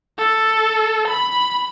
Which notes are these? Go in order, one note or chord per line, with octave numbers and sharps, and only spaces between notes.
A4
B5